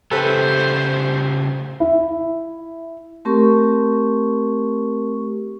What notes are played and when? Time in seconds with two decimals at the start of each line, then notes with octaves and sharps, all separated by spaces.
0.11 C#3 A3 G4 A4 B4 C5
1.80 E4 E5
3.25 A3 C4 G4 A#4 C#6